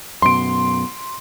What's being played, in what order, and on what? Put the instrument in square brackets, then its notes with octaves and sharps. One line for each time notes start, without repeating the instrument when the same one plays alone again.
[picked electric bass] F#2 B2 [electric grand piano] C6 D7